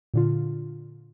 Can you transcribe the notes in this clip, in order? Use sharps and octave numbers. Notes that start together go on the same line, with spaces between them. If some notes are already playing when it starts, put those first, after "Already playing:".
A#2 D3 F4